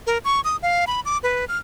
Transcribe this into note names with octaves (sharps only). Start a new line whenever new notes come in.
A#4
C#6
D#6
F5
B5
D6
B4
F6